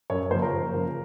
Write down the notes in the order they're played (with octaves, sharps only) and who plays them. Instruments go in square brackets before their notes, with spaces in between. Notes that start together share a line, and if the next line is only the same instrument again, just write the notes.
[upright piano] F#2 C#5
C#3 F3 A#3 C5
A#4
F#2
C#3 F3 A#3